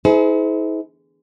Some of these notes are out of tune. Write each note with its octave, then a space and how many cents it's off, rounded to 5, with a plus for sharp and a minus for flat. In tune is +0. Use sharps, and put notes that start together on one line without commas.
E4 -45 G#4 +35 C5 -35